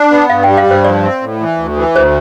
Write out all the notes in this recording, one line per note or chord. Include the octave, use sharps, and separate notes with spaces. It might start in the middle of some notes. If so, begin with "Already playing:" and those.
Already playing: D4
B3
G2 F5
G3 G5
F5
G2 C5
F3 D5
C4
A2
E3
D2
E3
D2 C5